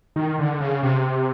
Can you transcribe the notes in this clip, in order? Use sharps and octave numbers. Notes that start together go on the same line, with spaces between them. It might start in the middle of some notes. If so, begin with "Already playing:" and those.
D#3
D3
C#3
C3